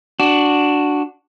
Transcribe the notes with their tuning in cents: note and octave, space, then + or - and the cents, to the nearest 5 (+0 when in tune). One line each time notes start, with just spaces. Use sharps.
D4 +0 F#4 +0